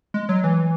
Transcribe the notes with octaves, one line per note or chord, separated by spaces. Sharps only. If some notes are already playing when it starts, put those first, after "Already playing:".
G#3
F#3
E3